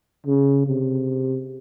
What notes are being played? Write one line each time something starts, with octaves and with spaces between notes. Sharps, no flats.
C#3
C3